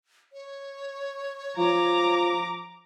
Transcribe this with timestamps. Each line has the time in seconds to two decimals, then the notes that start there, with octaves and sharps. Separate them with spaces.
0.33 C#5
1.57 F3 A#5 D6